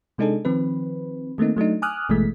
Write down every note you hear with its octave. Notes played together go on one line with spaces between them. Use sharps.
C3 G#3 D4 D#4 G#4 A4
D#3 F3 C4 B4
D#3 A3 A#3 C4 D#4
F#3 A3 D4 D#4
G#5 D6 D#6 F6 F#6
G#1 B2 E3 G#3 A3 B6